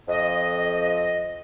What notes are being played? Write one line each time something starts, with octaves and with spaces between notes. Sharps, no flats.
F2 D#5